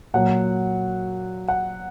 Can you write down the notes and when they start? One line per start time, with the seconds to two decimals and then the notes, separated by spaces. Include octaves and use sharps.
0.14 A#2 F#3 F#5
1.48 F#5